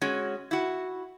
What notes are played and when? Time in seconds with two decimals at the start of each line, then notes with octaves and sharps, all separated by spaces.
0.01 G#3 C#4 F#4
0.51 E4 F#4